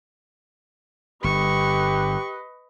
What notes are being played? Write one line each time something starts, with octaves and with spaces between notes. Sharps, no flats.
G1 G4 B4 D#5 C#6